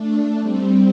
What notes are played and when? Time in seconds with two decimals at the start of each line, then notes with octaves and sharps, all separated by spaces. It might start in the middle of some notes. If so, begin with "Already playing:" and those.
Already playing: A3 D4
0.42 G3 C4